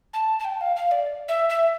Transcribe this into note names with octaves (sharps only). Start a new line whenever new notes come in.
A5
A5
G5
F5
F5
D5
E5
E5